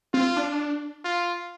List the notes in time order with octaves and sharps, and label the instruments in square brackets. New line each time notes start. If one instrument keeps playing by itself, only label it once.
[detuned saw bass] C4 [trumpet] F4
[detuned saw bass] D4
[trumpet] F4